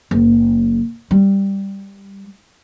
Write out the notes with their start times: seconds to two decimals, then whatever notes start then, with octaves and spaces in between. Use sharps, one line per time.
0.11 F#1
1.11 G3